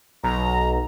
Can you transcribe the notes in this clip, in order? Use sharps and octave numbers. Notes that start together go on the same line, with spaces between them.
B1 A#5